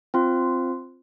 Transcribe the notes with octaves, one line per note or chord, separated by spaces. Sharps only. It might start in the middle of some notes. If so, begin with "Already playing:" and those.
C4 F4